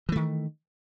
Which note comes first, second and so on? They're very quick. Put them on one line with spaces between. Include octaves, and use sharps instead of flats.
E3 A3 D#3